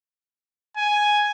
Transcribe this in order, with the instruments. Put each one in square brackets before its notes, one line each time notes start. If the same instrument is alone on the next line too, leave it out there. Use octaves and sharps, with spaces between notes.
[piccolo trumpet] G#5